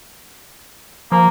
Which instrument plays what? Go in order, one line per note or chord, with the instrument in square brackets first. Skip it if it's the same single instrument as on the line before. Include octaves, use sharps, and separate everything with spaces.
[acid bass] F3 [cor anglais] A#3